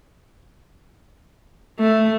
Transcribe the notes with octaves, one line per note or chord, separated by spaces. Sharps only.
A3